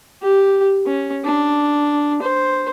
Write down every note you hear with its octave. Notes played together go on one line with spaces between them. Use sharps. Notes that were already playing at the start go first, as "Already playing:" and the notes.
G4
C#4
D4
C5